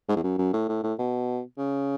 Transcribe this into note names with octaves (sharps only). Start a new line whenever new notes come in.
G#2
E2
F#2
F#2
A2
A2
A2
B2
C#3